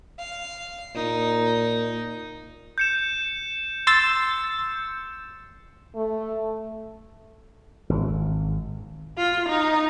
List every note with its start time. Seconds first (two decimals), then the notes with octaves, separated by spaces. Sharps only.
0.19 F5
0.95 A#2 D#4
2.78 G6 C#7 E7
3.87 C6 E6 A6
5.95 A3
7.90 G#1
9.17 F4
9.49 D#4